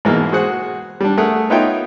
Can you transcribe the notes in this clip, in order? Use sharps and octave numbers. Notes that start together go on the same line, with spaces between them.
G#2 B2 E3 G#3 A#3
F#4 G#4 C5 F#5
G3 D4
A3 G#4 A#4 F#5
B3 D#4 F4 C#5 E5 G5